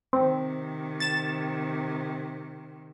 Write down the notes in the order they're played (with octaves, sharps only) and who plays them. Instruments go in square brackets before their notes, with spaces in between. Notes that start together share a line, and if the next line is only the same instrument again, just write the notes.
[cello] C3 D#3 [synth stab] C4
[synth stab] A6 E7